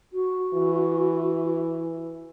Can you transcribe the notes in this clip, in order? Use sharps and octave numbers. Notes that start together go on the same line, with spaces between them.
F#4
E3